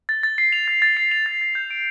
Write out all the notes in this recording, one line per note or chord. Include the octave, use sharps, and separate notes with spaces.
A6
A6
C7
F7
A6
A6
C7
F7
A6
A6
G6
D7